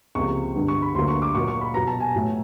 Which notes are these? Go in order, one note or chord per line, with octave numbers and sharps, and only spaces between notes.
C#2 C3 F3 A#3 C#6
G2 D3 G3 B3
C#6
B5
D2 D3 F#3 A#3 C6
C#6
D6
A#2 F#3 A#3 C#6
C#6
B5
B2 F#3 B3 A#5
A5
G#5
A2 F#3 A3